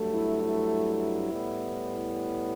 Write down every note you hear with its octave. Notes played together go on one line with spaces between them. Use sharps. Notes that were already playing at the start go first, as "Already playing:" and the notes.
Already playing: G2 F#3 A3
E4
E4
A2 G3 B3